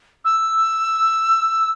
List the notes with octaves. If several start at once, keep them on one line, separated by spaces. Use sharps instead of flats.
E6